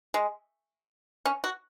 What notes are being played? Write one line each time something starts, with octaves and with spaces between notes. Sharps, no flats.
G#3
C#4
F#4